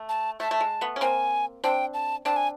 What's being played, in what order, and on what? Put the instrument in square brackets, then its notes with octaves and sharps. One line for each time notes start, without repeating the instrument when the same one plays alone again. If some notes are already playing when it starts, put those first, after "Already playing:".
Already playing: [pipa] A3
[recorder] A5
[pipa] A3 [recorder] A5
[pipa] A3
G#3
A3 B3
C#4
[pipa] A#3 C4 [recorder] G#5
[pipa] C4 D4 [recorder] G5
[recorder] A5
[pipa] C4 D4 [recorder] A5
[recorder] G#5